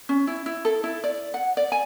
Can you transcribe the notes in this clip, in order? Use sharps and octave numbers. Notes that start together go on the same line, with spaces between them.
C#4
E4
E4
A4
E4
D5
F#5
D5
G#5